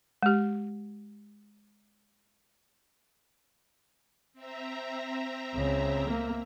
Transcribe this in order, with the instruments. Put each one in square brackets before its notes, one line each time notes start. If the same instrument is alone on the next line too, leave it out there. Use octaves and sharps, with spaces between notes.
[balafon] G#3 G4
[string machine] C4 E5 A#5
[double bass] C#2 C#3
A#3